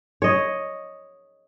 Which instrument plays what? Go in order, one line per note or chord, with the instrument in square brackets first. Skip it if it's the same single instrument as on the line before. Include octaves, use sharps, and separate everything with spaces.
[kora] C#5 D#5